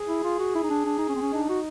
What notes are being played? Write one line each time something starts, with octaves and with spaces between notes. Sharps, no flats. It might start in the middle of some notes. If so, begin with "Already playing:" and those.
Already playing: G#4
E4
F4
F#4
E4
D#4
D4
D4
D#4
C#4
C4
C#4
D4 D#4
F#4